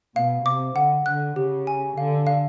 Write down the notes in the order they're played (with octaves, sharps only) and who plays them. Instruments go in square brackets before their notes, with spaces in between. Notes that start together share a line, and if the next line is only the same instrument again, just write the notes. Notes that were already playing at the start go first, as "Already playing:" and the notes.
[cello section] B2 [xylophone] F5
[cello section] C3 [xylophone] D6
[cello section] D3 [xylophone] F#5
[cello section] D3 [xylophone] F#6
[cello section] C#3 [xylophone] G4
[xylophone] G#5
[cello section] D3 [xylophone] F5
[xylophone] F5